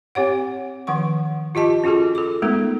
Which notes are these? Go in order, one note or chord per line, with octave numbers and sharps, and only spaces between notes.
C4 G4 C#5 F#5
D#3 F3 F#5 C#6
F4 G4 D#5 A5
C#4 F4 F#4 G#4 A4
A4 D6
G#3 A3 B3 D#4 A4 A#4